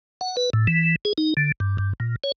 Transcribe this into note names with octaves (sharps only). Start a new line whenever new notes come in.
F#5
B4
A2
E3
G#4
D#4
D3
G2
G2
A#2
C#5